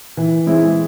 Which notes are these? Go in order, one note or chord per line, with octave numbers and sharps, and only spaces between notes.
E3
G#3 C4 E4